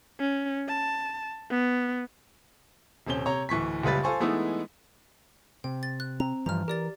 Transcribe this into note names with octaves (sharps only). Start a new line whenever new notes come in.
C#4
A5
B3
D#1 C3 C4 C#4 G7
C3 C#5 A#5
D1 E3 C#6 B6
F#1 C#2 G3 B4 A6
F4 A4 C5 G#5 C#6
E3 G#3 A3 B3 D#4 E4
C3 G5
A6
F#6
C4 A#5
G2 E3 F3 A#5 F6
G4 A#4 D5 A6